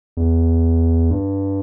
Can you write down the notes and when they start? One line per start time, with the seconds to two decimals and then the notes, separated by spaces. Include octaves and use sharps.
0.17 E2
1.11 G2